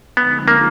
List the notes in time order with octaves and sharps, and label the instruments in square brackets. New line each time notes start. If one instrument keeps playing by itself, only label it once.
[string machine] D3 F3 G#3 C4 D#4 [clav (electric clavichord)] B3
[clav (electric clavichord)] A#3